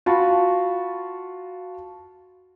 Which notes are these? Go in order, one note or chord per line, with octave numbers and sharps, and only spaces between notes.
F4 F#4 A5 B5